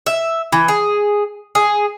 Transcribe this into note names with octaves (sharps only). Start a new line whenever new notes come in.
E5
E3
G#4
G#4